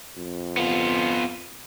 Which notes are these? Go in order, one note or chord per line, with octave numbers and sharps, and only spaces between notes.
F2
B3 F4